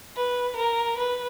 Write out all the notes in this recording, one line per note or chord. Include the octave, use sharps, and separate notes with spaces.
B4
A#4
B4